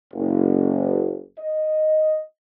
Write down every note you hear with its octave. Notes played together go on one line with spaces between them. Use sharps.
F#1
D#5